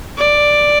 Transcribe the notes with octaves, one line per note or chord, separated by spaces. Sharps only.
D5